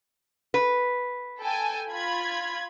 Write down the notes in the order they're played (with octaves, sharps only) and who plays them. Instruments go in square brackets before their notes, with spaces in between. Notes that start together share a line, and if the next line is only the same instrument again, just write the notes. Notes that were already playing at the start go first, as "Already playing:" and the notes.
[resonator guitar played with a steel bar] B4
[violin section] A4 G5 G#5
F4 B5 G#6